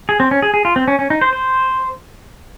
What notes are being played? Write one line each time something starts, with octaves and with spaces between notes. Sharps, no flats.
G#4
C4
C#4
G#4
G#4
F4
C4
C#4
C#4
D#4
C5
C5